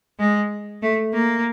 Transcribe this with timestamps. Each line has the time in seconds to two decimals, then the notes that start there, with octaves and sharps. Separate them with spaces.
0.19 G#3
0.82 A3
1.13 A#3